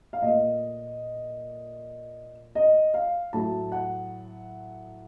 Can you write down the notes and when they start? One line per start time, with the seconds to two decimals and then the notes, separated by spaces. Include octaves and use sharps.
0.13 F5
0.22 A#2 A3 D#5
2.55 D#5
2.94 F5
3.33 A2 F#3 A3 A5
3.72 F#5